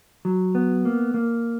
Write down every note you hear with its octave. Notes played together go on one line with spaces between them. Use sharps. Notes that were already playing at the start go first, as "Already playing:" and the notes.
F#3
B3
A#3
A#3